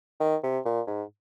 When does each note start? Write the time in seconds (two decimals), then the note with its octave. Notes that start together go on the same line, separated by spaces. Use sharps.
0.20 D#3
0.43 C3
0.65 A#2
0.87 G#2